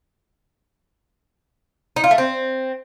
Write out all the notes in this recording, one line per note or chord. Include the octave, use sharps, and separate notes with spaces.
D#4
F4
A3
C4